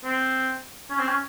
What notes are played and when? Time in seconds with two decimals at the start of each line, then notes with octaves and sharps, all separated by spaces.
0.04 C4
0.90 C#4
0.99 C4
1.08 C#4